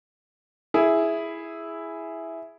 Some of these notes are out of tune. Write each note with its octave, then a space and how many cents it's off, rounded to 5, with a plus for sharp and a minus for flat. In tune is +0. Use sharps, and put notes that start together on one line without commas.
E4 +0 G#4 +0